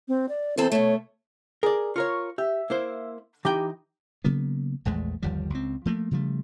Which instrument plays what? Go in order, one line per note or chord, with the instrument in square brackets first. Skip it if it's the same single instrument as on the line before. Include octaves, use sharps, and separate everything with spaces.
[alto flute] C4
D5
[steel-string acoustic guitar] E2 A4 C5 [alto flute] C4
[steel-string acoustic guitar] B2 A3 [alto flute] C#5
[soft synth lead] G#4 [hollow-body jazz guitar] A#4 D5
[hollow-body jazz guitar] F4 A#4 C#5 [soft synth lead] C#6
[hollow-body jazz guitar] G4 [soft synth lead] E5
[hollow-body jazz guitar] A#3 E4 C5
[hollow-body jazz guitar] E3 D#4 G5 [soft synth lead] G4
[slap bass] C#3 F#3 A#3 B3
A#1 E2 G#3 A3
G1 D#2 F3 G3
C#2 C4
F3 A3 A#3
C#3 F3 G3 A3